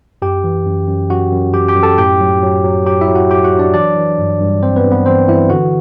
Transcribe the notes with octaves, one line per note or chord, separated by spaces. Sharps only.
F#2 G4 G5
E3
F#2
F#2
F#2 F#4 F#5
F#2
F#2 G4 G5
G4 G5
F#2
A4 A5
A2 G4 G5
F#3
F#3
F#3
F#3 G4 G5
E4 E5
F#3
F#4 F#5
F#3 G4 G5
F#4 F#5
F#3
D4 D5
E3 D4 D5
E3
G2
G2
G2 C4 C5
B3 B4
G2
B3 B4
E3 C4 C5
E3 E4 E5
D3 F#4 F#5